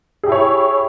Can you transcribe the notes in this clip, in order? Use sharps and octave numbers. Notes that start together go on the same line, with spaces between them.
E4 G4 G#4 C#5